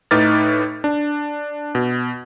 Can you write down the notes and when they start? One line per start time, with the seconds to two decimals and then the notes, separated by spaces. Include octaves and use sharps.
0.11 A2 D#4 B4 D6 F6 A6
0.84 D4
1.75 B2